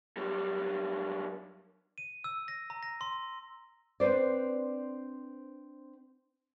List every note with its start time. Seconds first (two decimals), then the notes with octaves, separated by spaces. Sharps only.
0.17 F#2 G3
1.98 D#7
2.24 E6
2.48 A#6
2.70 A#5
2.83 A#6
3.01 C6
4.00 C4 D4 B4 C5 D5